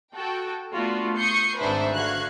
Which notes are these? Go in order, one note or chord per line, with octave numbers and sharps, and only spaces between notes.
F#4 A4 G5
A3 B3 D4 F4 F#4
C#6 D#6 G6 C7 C#7
G#1 G#2 D4 B4 C5 E5
D3 F#4 F5 F#6 G#6